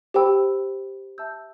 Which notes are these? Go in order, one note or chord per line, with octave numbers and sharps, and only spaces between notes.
G4 C5 G5 B5 E6
E5 A5 E6 G6